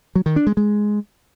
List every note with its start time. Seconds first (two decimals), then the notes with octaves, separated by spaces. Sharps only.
0.15 F#3
0.26 D#3
0.36 D4
0.47 G#3
0.57 G#3